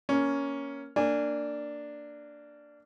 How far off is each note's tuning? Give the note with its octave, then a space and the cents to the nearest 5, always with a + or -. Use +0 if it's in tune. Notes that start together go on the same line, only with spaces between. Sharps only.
A#3 +10 C#4 +10
A#3 -20 D4 +0 G#5 -15